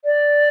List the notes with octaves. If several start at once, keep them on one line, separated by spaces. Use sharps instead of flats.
D5